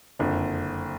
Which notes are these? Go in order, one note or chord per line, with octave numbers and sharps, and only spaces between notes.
F#1 F2 D3